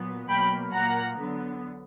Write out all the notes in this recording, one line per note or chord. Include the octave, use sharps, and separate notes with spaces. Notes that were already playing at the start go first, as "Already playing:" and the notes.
Already playing: A#2 F#3 B3
B2 F#3 A#3 G5 B5
A#2 A#3 F#5 A#5
D3 F#3 B3